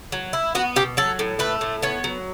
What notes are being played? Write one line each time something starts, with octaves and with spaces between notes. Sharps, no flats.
F#3
E4
B3 F#4
B2 G4
F#3 A4
A2
A3 B4
A2
B3 C#5
F#3